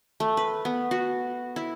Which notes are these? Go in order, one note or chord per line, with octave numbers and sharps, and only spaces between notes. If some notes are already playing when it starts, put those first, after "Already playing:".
A3
B4
B3
F#4
E4